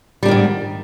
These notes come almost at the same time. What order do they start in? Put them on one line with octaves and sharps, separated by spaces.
G3 D4 D#3 G#2